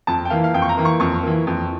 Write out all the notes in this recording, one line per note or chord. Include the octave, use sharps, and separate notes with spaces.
F2 A5
G5
E3 A#3 F5
F5
F2 G5
C#6
A#5
E3 A#3
C#6
F2 C#6
E3 A#3
F2